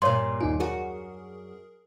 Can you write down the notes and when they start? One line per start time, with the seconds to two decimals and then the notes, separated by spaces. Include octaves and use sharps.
0.02 G2 A#2 C#5 C6
0.41 D#2 D#4 F4 G#5
0.60 F#2 F#4 G#4 A#4